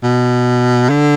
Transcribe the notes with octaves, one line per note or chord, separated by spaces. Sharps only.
B2
D3